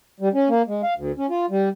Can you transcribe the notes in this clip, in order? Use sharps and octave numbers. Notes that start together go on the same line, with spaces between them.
G3
C#4
A#3
G#3
F5
D2
C#4
F4
G3